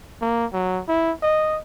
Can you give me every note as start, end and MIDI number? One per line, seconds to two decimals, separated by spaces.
0.22 0.46 58
0.53 0.82 54
0.88 1.12 64
1.23 1.60 75